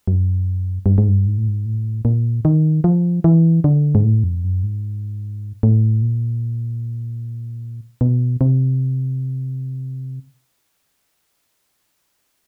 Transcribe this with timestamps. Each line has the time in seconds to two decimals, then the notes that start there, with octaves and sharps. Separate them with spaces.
0.07 F#2
0.86 G2
0.98 G#2
1.08 G2
1.27 G#2
1.38 A2
1.48 G#2
1.66 A2
2.05 A#2
2.45 D#3
2.84 F3
3.24 E3
3.64 D3
3.95 G#2
4.04 A2
4.24 F2
4.44 F#2
4.63 G#2
5.63 A2
6.02 A#2
8.01 B2
8.41 C3